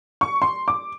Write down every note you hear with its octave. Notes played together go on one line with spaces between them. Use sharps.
C#6
C6
D6